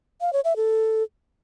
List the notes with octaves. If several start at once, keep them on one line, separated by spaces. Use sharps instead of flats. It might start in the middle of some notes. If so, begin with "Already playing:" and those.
F5
C#5
E5
A4